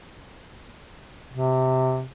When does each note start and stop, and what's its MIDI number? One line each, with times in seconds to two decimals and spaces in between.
1.33 2.04 48